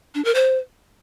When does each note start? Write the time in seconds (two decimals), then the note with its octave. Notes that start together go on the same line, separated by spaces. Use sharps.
0.15 D4
0.25 A#4
0.35 C5